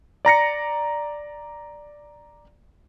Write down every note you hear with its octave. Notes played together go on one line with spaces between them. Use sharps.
D5 A#5 A#6 C#7